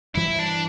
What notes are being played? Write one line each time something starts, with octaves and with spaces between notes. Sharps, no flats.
G2 E3 G3 E4
D4